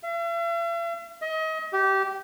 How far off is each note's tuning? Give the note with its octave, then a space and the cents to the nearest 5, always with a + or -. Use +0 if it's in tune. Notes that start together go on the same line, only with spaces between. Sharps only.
E5 +45
D#5 +30
G4 -20